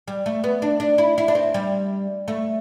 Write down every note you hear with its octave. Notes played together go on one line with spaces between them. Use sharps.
G3
A3
B3
D4
D4
E4
E4
D4
C4
G3
A3